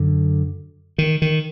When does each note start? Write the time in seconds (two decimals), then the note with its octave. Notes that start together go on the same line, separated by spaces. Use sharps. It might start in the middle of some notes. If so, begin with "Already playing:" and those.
Already playing: F#2 D3
0.98 D#3
1.22 D#3